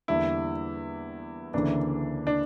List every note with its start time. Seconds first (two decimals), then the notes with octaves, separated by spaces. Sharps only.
0.08 E2 D3 G3 A#3 E4
1.54 D2 C#3 E3 A#3 D4
2.27 D4